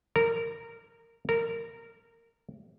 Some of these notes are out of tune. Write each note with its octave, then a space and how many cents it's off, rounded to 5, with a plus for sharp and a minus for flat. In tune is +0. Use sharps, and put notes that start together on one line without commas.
A#4 -15
A#4 -15